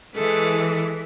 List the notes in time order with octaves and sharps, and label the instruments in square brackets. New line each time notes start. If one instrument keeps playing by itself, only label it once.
[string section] E3 [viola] G#3 A4